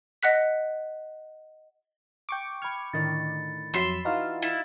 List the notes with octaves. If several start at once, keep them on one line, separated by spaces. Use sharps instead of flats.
D#5 F#5 F#6 B6
G5 C#6 D6
B5 F6 G#6 C#7
A2 D3 D#3 A6
F2 F#3 E5 B5 C6
E3 D#4 F4 F#4 F5
E4 A6